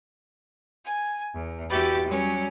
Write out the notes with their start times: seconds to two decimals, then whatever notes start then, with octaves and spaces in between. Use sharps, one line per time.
0.85 G#5
1.32 E2
1.69 E2 E4 F#4 G4 B4 A6
2.05 F#3 G3 C#4